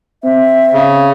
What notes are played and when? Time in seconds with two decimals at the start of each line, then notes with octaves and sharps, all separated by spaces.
0.24 C4 E5
0.73 C#3